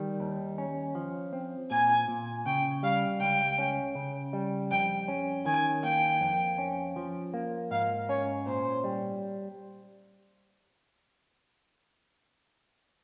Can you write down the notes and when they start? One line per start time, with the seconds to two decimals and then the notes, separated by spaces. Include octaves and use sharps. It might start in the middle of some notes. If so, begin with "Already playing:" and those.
Already playing: D#3 G3
0.20 D#2
0.58 C#4
0.95 F3
1.33 C4
1.70 A#2 G#5
2.08 A#2
2.46 C#3 G5
2.83 G3 F5
3.20 C#2 G5
3.58 C#4
3.95 C#3
4.33 G3
4.71 F2 G5
5.08 C#4
5.46 D#3 G#5
5.84 A#3 G5
6.21 F2
6.58 C#4
6.96 F3
7.34 A#3
7.71 G#2 F5
8.09 C#4 C#5
8.46 A#2 C5
8.84 G3